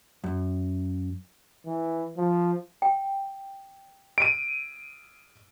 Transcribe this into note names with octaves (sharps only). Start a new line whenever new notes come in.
F#2
E3
F3
G5
D7 D#7